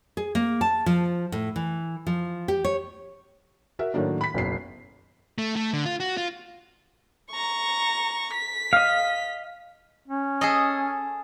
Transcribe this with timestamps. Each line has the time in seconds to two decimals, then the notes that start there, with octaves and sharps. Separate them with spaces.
0.17 G#4
0.35 A#3
0.61 A5
0.86 F3
1.32 A2
1.56 E3
2.07 F3
2.48 G4
2.64 C#5
3.79 F#4 A#4 E5
3.94 A2 D#3 F#3 A#3 D4
4.21 B5 B6
4.34 F#1 B1 C7
5.38 A3
5.56 A3
5.73 D3
5.86 F4
6.00 F#4
6.17 F4
7.32 A#5 C#6
8.33 B6
8.73 D#5 F5
10.08 C#4
10.41 G#4 A4 D#5